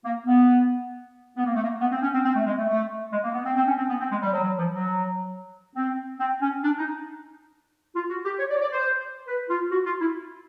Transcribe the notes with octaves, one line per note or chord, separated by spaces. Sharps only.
A#3
B3
B3
A#3
A3
A#3
B3
C4
C#4
C4
C4
A3
G#3
A3
A3
G#3
A#3
B3
C4
C4
C#4
C4
B3
C4
G#3
G3
F#3
F#3
F3
F#3
C4
C4
C#4
D4
D#4
F4
F#4
G4
C#5
D5
C#5
D5
C5
B4
F4
F#4
F4
E4